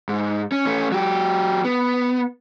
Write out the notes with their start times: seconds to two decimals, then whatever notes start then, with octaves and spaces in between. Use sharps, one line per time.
0.09 G#2
0.52 C#4
0.66 A3 C#4
0.92 F#3 G4
1.65 B3